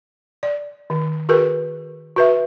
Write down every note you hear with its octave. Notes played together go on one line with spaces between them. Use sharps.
D5
D#3
F#4 G#4 A#4 B4
F#4 B4 E5